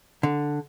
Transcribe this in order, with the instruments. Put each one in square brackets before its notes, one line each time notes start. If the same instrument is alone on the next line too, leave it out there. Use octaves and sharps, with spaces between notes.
[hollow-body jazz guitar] D3